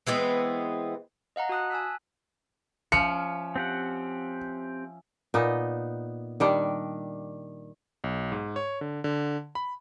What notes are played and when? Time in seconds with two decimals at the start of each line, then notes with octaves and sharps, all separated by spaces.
0.07 E3 G#3 B3 C4
1.36 D#5 F5 F#5 A#5
1.49 F#4 A5 D#6 F#6
1.70 G#5 A5 E6 F#6 B6
2.92 F3 C#4 E5 F5 C#7
3.56 C4 G4 F#5
5.34 A#2 B3 D#4 D#5
6.40 D#3 G3 D4
8.04 B1
8.32 G#2
8.56 C#5
8.81 D3
9.04 D3
9.55 B5